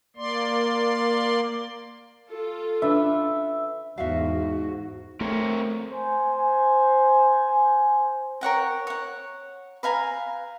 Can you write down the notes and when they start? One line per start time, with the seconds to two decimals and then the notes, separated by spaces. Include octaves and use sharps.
0.16 A#3 D5 C6
2.29 F4 A4
2.82 D4 B4 E5
3.98 E2 G#2 F#4 E5 F5
5.21 A3 C4 A#4 C#5
5.92 C5 G#5
8.41 A#4 C#5 F#5 G5
8.87 C#5 F#5
9.83 B4 F5 G#5 A#5